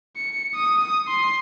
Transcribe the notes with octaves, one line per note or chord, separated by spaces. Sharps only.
C#7
D#6
C6